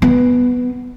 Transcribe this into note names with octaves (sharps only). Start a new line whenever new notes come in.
B3